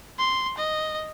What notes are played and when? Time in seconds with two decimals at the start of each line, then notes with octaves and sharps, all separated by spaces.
0.19 C6
0.58 D#5